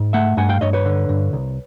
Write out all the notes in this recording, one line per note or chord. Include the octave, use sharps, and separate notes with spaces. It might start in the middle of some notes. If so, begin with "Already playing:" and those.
Already playing: G#2
A3 E5 F#5
G2 F#5 G#5
F5 G5
G2 C#5 D#5
B4 C#5
D3
G2
C2